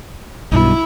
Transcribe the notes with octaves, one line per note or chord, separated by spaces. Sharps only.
B1 G2 B2 E4